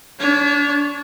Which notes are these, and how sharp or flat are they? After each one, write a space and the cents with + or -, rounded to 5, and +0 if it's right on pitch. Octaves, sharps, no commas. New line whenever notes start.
D4 -30 C#5 +0